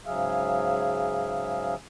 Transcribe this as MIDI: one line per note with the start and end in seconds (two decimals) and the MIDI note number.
0.06 1.75 44
0.06 1.75 49
0.06 1.75 54
0.06 1.75 68
0.06 1.75 76
0.06 1.75 77